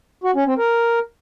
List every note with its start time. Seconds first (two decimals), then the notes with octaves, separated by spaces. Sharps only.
0.24 F#4
0.35 C#4
0.46 C4
0.58 A#4